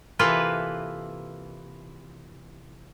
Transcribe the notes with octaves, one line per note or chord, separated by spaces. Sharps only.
C3 E3 A#3 F4 A4 B4